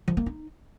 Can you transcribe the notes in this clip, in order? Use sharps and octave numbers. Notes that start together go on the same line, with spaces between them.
F3
A#3
D#4